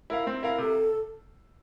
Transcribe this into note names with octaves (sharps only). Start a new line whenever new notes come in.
E4 A#4 F5
C4
E4 A#4 F5
C3 A4